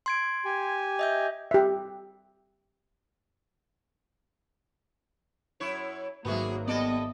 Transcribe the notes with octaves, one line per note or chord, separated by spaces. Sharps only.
C6 G#6 D7
G4 G#5
D#5 E5 G6
G4 E5
F#2 E4 C#5
G#1 F#3 A#3 B3 F#4 G#4 E5
G3 B3 A4 D5 D#5